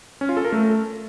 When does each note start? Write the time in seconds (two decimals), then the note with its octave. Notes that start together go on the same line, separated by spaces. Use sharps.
0.21 C#4
0.29 F4
0.37 A4
0.45 A#4
0.52 A3